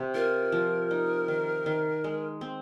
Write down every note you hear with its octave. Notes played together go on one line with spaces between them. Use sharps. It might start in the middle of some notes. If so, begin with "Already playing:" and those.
Already playing: C3 C4
F4 A#4
F3
D#4
D#3
D#3
G#3
C4